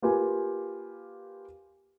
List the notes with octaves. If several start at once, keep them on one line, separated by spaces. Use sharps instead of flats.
A#3 F4 G4 B4 F5 G#5